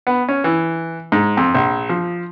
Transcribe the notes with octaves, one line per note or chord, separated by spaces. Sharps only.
B3
C#4
E3
G#2
F2
A#1
F3